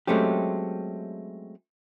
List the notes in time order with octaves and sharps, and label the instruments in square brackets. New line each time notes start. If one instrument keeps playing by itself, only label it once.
[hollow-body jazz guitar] F#3 G#3 A3 C4 C#4 G4